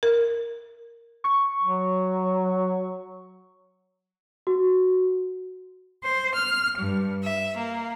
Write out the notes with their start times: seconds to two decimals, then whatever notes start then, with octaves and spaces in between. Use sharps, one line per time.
0.03 A#4
1.24 C#6
1.63 F#3
4.47 F#4
6.03 C5
6.35 F6
6.77 G2
7.24 E5
7.57 A#3